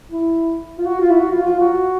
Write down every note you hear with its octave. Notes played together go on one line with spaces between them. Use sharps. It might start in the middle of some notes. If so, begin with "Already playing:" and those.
E4
F4
F#4
F4
E4
F#4
F4
F4
F#4